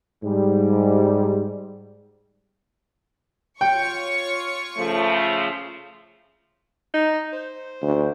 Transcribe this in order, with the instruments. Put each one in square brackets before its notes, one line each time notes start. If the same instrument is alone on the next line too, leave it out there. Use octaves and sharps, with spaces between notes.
[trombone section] G#2 G3
[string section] F4 C#5 C#6 [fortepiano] G5
[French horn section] C#3 F3 A3
[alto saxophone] D#4
C5
[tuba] D2